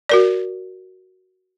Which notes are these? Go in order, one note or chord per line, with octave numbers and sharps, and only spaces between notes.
F#4 A#4 D5